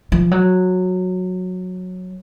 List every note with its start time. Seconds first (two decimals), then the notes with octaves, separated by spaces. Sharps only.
0.12 F3
0.31 F#3